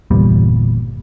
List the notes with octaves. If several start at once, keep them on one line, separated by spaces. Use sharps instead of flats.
G1 E2 A#2 G3